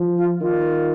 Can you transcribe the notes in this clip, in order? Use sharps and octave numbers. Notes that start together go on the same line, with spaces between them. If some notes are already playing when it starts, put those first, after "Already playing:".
Already playing: F3
F4
D#3 F4